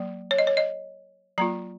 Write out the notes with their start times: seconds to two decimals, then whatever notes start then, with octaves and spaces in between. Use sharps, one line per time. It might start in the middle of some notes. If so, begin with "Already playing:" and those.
Already playing: F#3 A#3
0.31 C#5
0.39 D#5
0.47 C#5
0.57 D#5
1.38 F#3 A#3 F4 A#5